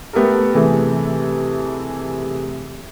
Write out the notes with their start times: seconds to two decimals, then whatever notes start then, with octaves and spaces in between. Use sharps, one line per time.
0.13 A3 B3 G4 A4 A#4
0.54 C3 E3 A3 G#4